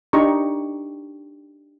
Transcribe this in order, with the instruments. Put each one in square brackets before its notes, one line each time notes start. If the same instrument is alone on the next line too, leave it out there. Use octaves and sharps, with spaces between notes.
[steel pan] D4 D#4 G4 A#5 C#6